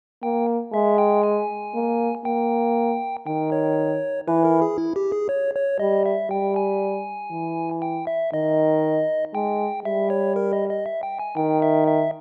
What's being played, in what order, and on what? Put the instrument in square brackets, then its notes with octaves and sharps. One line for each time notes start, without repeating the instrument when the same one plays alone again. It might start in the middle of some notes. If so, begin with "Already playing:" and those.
[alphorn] A#3 [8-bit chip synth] G5
[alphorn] G#3 [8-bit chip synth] E5
[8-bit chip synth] G5
G#5
[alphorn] A#3
[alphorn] A#3 [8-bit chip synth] G5
[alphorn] D#3 [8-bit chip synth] G5
[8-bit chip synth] C#5
[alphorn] E3 [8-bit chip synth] B4
[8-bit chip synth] A#4
G#4
E4
G4
G#4
C#5
C#5
[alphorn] G3 [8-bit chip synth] D#5
[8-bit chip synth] E5
[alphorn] G3 [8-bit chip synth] G5
[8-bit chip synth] G#5
[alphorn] E3
[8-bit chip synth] G5
E5
[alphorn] D#3 [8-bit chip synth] D#5
[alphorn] G#3 [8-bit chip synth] G5
[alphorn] G3 [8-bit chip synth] E5
[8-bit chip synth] C#5
A#4
D#5
D#5
E5
G5
G#5
[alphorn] D#3 [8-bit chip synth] G5
[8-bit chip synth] E5
E5